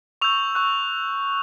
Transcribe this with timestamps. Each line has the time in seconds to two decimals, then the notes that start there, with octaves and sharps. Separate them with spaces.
0.21 C#6 E6 G6 F7
0.55 C#6 F#6